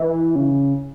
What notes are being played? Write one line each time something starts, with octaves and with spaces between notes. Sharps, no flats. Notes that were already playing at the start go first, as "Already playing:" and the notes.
Already playing: E3
C#3